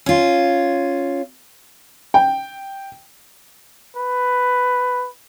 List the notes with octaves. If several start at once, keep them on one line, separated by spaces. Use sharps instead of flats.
C#4 F4
G5
B4